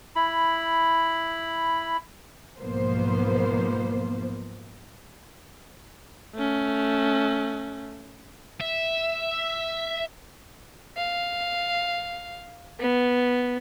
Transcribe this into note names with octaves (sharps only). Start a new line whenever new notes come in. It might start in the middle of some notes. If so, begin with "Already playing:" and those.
E4 B5
B1 G#2 F3 A#3 B3 C5
A3 C#4
E5
F5
B3